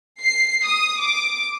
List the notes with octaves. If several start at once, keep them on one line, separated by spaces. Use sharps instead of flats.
C7
D#6
D6